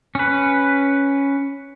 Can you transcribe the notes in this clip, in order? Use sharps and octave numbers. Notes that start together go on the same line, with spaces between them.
C#4 B4